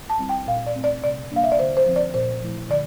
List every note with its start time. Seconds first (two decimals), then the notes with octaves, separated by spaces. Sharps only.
0.10 A5
0.19 G3 C4 E4
0.29 G5
0.47 A#2 F5
0.67 D5
0.76 A3 C4
0.84 D5
1.02 C3 D5
1.31 G3 A#3 D4 F5
1.44 E5
1.52 D5
1.59 D3 C5
1.77 C5
1.86 F3 C4
1.96 D5
2.14 A#2 C5
2.42 F3 A3 E4
2.70 D3 D5